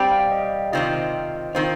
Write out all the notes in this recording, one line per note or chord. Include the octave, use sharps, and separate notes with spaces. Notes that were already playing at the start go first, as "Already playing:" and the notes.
Already playing: G3 C4 G4
F5
D#5
C3 D#3 C4 F4 D#5
D#3 C4 F4 C5